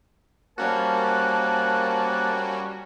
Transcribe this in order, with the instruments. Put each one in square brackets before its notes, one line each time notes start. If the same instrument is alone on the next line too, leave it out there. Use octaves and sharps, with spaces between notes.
[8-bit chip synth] G3 C#4 F#4 [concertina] A#3 F#6 [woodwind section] A#4 C5 A5